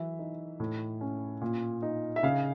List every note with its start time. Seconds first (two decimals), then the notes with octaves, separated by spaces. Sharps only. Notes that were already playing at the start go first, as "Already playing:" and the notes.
Already playing: E3 F#3 E5
0.19 D#4
0.60 A2
1.01 C#4
1.41 A#2
1.82 D#4
2.16 E5
2.23 C#3 F5